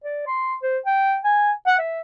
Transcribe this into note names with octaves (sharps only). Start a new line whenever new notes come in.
D5
C6
C5
G5
G#5
F#5
E5